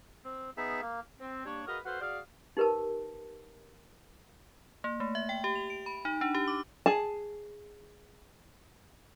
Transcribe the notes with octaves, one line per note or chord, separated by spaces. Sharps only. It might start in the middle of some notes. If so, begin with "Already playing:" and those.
C4
B3 D#4 G#4 E5
A#3
C4
G3 A#3 D4 C#5
F#4 G#4 A#4 B4 D#5 F5
F#4 A4 B4 C5 F5 F#5
F#4 G#4 D5 F5
D#4 G4 A#4 B4 A5
A#3
A3
E5
G5
G4
F7
D7
B5
D#4
D4
G4
D6
G#4 A5